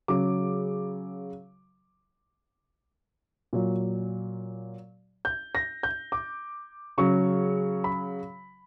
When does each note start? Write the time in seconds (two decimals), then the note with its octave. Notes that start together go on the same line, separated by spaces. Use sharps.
0.08 C#3 F#3 D6
3.53 A#2 F#3
5.25 G6
5.55 A#6
5.83 G6
6.12 D6
6.98 C#3 F#3 C#6
7.84 B5